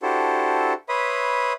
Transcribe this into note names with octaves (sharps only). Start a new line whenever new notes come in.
D4 E4 F#4 G4 A4 C5
B4 C#5 E5 B5 C6 D#6